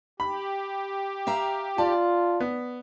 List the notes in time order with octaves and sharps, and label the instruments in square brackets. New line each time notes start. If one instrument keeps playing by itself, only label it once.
[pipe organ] G4 [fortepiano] B5
[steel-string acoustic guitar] E5 F5 A#5
[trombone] F4 [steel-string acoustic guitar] D5 [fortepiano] A5
[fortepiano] B3